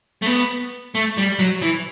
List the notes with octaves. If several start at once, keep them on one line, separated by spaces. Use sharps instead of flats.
A3
B3
A3
G3
F#3
E3